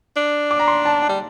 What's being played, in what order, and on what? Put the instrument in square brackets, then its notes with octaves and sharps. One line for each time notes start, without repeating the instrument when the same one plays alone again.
[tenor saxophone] D4
[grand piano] D6
A#5
C6
A5
A5
[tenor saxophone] G3